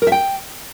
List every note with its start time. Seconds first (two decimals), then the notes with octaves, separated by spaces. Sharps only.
0.02 A#4
0.07 E5
0.12 G5